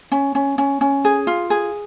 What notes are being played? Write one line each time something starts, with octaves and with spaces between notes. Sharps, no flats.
C#4
C#4
C#4
C#4
G#4
F4
G#4